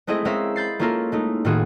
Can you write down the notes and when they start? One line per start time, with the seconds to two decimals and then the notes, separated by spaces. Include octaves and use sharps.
0.07 G#3 A3 C4 E4 G#4 D#5
0.25 G#3 C4 C#4 A#4 E5 F5
0.56 B5 G6 A6 C7
0.79 A#3 C#4 E4 F4 A4 A#4
1.12 G#3 A3 D#4
1.45 A2 D#3 F4 F#4 G#4